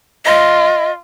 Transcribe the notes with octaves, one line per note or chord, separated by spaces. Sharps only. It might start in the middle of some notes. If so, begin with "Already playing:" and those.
F4 D#5